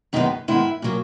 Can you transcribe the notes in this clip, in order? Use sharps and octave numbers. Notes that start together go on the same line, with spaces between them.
F#2 D#3 G#3 B3 D#4
G#2 D#3 G#3 B3 E4
A#2 F#3 A#3